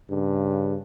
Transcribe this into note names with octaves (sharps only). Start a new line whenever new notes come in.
G2 C#3